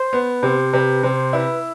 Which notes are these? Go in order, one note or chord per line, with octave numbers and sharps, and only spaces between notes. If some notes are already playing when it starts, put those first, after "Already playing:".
Already playing: C5
B3
C3 C5
C3 B4
C3 C5
E4 B4